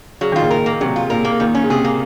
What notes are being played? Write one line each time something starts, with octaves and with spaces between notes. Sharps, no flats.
C#3 F#3
D#3 F4
A#2 C#3
A#4
A#3
C3 F#3
F4
A#2 A#4
A#3
A#2 D#3
C#4
C#3
C3 G#4
A#3